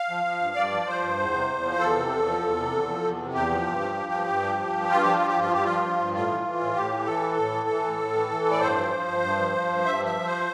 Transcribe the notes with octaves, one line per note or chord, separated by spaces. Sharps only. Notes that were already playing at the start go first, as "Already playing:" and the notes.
Already playing: F5
F3
F3
G2
G2 D5
F3
F3 C5
G2
E2
C3
E2
F3
E2 A4
C3
E2
F3
E2
C3
E2
F3
E2
C3
E2 G4
F3
G2
F3
F3
G2
G2
F3
F3
G2
G2 F4
F3 G4
F4
F3
G4
G2 F4
G2 G4
F3 F4
F3
G2
A2 F4
E3
E3
A2
A2 G4
E3
E3 A4
A2
A2
E3
E3
A2
A2
E3
E3
A2
D5
G2 C5
F3
F3
G2
G2
F3
F3
G2
G2 E5
F3 E5
F3
C5